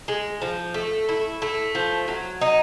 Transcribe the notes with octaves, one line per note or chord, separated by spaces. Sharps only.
G#3
F3
A3
E4
A3
F3
F#3
D#4